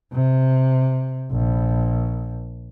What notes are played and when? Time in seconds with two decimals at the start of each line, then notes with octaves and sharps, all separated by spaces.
0.13 C3
1.32 A#1